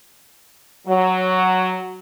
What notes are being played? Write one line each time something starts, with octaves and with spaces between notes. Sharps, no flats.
F#3